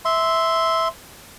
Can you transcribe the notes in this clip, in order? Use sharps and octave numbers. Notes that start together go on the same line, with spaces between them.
E5 C6